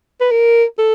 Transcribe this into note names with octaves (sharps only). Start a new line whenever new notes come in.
B4
A#4
A4